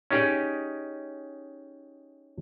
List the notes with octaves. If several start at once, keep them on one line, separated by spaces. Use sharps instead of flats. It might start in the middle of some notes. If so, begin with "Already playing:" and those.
C#4 D#4 G4 G#4 D5 D#5